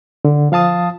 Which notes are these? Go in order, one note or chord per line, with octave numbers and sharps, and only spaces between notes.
D3
F3 F5 A5 D#6 A6